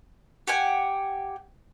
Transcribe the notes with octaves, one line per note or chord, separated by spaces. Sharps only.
G4 F#5 G#5